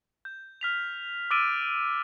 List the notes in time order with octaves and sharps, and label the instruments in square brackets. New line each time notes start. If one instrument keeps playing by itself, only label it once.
[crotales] G6
F6 B6 F7
D6 E6 F6 A6 D7 D#7